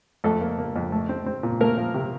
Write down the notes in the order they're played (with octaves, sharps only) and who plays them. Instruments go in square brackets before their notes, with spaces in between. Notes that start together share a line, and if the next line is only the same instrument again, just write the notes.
[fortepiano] F2 A3 A4
A#3
A#3
F2
A3
C4
C4
A#2
A3 A#3 A#4
F3
C3